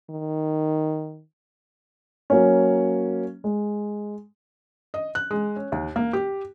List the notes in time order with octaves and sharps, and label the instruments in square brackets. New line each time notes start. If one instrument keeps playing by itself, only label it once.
[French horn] D#3
[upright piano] F#3 A#3 C#4
G#3
[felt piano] D#5
F#6
G#3
C#4
D#2
A#3
G4